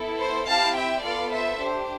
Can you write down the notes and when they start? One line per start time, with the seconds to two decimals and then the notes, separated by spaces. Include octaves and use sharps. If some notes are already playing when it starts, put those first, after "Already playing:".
Already playing: B3 E4 A4
0.20 C5
0.47 C4 E4 G4 F5 A5
0.76 E5 G5
1.04 B3 F4 A4 D5 F5
1.32 C5 E5
1.60 D4 G4 C5